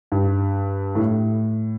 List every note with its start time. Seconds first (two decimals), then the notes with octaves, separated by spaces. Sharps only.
0.12 G2
0.95 A2